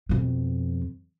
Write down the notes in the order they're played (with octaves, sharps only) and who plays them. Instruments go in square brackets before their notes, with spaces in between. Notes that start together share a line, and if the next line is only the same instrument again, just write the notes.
[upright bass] F2 B2